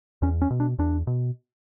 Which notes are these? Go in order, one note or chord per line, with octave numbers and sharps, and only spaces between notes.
E2 C#4
C#4
B2
D4
E2 D4
B2